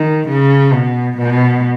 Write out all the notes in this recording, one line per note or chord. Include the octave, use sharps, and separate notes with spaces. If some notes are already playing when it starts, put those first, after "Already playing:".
Already playing: D#3
C#3
B2
B2